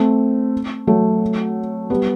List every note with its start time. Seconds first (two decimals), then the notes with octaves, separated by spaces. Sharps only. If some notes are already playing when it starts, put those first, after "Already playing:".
Already playing: A3 C4
0.87 F#3 A3
1.90 G3 B3